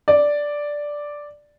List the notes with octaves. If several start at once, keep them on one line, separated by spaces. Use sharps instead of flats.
D5